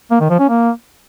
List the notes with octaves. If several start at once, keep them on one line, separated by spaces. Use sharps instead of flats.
A#3
D#3
F3
C#4
A#3